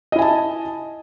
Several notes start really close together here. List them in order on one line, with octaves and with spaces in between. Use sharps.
D#5 E4 G#5 A5